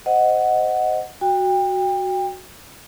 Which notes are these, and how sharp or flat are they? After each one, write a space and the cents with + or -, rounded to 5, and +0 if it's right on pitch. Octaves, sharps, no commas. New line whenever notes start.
C5 +0 D#5 +0 F#5 +0
F#4 +0 G5 +25